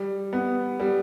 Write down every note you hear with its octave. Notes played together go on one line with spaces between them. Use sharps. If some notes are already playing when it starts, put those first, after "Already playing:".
Already playing: G3
B3
G3